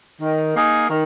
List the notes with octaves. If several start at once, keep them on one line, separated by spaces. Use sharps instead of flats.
D#3
A#3 D#4 G#4
D#3